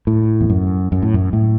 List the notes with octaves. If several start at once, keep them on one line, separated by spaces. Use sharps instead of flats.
A2
E2
F#2
F#2
A2
F#2
A2